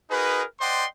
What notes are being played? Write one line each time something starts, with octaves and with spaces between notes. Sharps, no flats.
D#4 F#4 G#4 A#4 B4
C5 D5 D#5 F#5 G5 C6